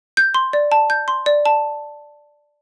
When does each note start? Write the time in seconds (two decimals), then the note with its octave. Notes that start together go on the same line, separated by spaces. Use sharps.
0.17 G6
0.34 C6
0.53 D5
0.72 A5
0.90 G6
1.08 C6
1.26 D5
1.46 A5